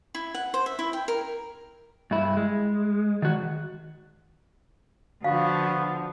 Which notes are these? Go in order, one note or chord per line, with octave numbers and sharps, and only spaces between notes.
E4
F#5
C5
E5
E4
G5
A#4
G2 E4
G#3
D#3 F#4
D3 F3 B3 F#4 F5